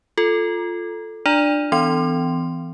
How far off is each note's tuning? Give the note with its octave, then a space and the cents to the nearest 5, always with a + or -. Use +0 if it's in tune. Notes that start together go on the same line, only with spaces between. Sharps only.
F4 +0 A4 +0
D4 +20 D5 +0 A#5 +0
E3 -5 C4 -45 C6 -10